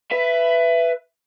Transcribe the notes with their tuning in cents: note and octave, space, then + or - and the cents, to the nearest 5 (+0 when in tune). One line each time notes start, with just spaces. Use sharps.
B4 +10 E5 +20